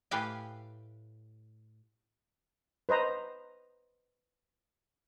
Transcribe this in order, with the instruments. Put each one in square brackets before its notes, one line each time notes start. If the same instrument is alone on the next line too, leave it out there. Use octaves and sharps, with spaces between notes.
[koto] A2 G4 B4 F5 G5 G#5
[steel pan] B4 C5 D#5 A#5